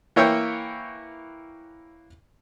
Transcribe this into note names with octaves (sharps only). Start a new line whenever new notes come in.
E3 A#3 C#5 E5 G5 E6